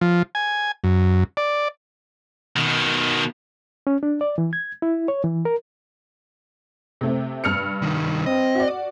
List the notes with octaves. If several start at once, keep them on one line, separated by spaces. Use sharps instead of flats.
F3
G#5
F#2
D5
B2 D#3
C#4
D4
D5
E3
G#6
E4
C#5
E3
A#4
C3 A3 C4
G2 F6 C#7
C2 D#3
C4 D#5
F#4 D5